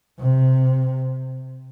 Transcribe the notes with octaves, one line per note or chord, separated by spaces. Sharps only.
C3